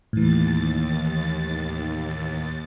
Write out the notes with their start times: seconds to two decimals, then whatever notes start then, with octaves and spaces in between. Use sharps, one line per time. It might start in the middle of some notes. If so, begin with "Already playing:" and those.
0.13 D#2 A2 E3 A6